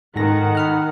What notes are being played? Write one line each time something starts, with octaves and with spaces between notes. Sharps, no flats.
G#2 D#3 A4 F#5 A#6
B5 F6 F#6